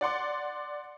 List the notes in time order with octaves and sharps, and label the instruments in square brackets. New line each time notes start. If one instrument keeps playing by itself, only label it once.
[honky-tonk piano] D5 F#5 C6 D6